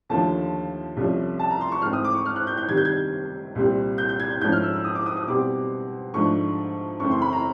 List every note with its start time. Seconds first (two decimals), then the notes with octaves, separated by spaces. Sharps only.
0.10 D#2 D3 F3 A3 A5
0.96 C2 C3 F3 A3 C#4
1.39 A5
1.50 A#5
1.61 C6
1.72 C#6
1.82 G#2 E3 A3 C4 F6
1.93 D#6
2.04 D6
2.15 C#6
2.26 F6
2.36 F#6
2.47 G6
2.57 G6
2.69 C3 D#3 G3 G#6
2.77 G6
2.85 G#6
3.55 C2 A#2 G3 C4
3.98 G6
4.09 G6
4.20 G#6
4.30 G6
4.41 G#2 F3 A3 C#4 G6
4.52 F6
4.62 E6
4.73 E6
4.84 D#6
4.95 D6
5.06 D#6
5.17 D#6
5.27 B2 G3 C4 D6
6.14 G#2 F3 A3 D4 C#6
7.00 F#2 C#3 E3 A3 C4 C#6
7.11 C6
7.22 B5
7.33 A#5